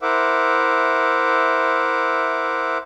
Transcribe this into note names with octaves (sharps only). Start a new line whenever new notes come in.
E4 A#4 C5 E5 F#5 D6